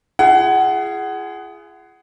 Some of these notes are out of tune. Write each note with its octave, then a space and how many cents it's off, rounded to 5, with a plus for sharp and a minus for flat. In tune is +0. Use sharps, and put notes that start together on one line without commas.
F4 -45 G#4 +0 F#5 +25